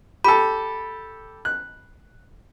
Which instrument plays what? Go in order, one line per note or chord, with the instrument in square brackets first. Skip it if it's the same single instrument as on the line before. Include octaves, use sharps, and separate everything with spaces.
[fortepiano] G4 A4 [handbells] B5
[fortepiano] F#6